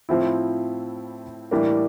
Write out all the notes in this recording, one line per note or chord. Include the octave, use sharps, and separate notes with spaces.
A2 F3 C4 E4
A2 E3 G3 A#3 D4